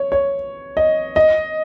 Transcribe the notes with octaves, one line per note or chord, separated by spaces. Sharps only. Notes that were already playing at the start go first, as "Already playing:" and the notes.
Already playing: C#5
C#5
D#5
D#5